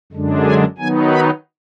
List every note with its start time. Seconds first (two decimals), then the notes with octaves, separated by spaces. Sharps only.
0.12 F#2 D3 G#3 D4
0.44 G#5
0.78 D#3 F#3 B3 D#4 G#5
1.10 B5